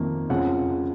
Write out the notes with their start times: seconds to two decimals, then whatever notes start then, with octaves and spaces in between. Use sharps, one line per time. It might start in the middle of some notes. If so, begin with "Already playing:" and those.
Already playing: F2 D#3 A#3
0.29 F2 C#3 F3 G#3 F#5